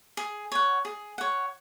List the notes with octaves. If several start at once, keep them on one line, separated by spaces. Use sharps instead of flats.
G#4
C#5 F#5
G#4
C#5 F#5